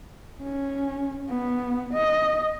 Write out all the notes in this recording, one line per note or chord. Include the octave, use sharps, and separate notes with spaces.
C#4
B3
D#5